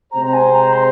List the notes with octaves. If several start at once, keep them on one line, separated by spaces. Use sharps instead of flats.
C3 G#3 C4 G#4 C5 A#5
A#5
G#5
A#5
C6